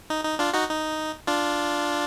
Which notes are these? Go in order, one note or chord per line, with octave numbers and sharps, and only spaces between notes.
D#4
D#4
D4 F4
D#4 F#4
D#4
D4 F4